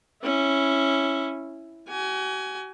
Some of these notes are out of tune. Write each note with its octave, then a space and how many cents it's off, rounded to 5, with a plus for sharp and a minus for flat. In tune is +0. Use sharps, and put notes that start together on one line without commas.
C#4 -5 E4 +0
F#4 +45 G#5 +10